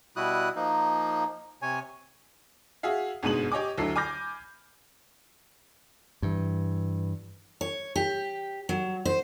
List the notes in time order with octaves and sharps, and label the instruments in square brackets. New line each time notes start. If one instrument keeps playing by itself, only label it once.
[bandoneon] B2 G3 E4 F#4 D#6 F#6
F3 A#3 D#4
C3 C#5 G#5
[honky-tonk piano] F#4 G#4 E5 F5
G1 G#2 B2 G#3 D#7 F#7
G4 C#5 D#5 G#5 D6
D2 F#3 E4 A4 C7
G#5 B5 D6 F6 G6 A#6
[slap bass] G2 E3
[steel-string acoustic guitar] C#5
G4
F#3
C5